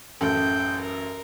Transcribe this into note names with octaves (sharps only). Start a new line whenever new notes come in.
A1 F#2 A4 G5
A#4